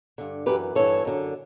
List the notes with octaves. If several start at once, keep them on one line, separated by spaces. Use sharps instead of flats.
G2 D3
F#2 E3 G4 B4
G2 E3 A4 C#5
F#2 D3